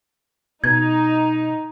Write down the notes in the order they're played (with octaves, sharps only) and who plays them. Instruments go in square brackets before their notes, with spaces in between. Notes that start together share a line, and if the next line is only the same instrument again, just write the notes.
[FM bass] B2 [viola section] D#4 [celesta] G#6